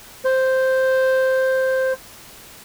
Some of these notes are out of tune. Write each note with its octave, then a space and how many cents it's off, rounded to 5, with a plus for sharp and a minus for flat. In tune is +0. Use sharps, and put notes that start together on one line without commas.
C5 +0